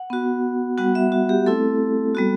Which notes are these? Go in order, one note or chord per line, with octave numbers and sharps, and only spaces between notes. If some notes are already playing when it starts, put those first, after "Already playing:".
Already playing: F#5
B3 F#4
G3 B3 F#4 F#5
E5
F#4
G4
A3 C4 E4 A4
G3 B3 F#4